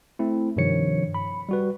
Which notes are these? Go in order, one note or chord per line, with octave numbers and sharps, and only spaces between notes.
A3 C4 E4
G2 C3 D#3 F3 C#5 C#7
B5
G3 F#4 B4